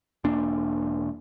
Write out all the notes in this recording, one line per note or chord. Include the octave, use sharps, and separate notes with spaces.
E1 A#3 D4